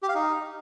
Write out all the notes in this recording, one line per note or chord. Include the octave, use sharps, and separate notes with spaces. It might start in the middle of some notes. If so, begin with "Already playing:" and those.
G4
F5
D#4